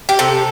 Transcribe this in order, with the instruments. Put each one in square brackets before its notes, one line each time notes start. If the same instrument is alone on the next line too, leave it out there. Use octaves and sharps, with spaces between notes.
[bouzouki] G4
C3 A4